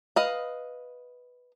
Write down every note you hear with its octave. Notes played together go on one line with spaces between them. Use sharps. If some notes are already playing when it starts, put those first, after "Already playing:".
B4 D#5 F5